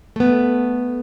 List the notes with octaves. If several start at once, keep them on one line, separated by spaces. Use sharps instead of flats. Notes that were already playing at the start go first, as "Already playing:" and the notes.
A3 B3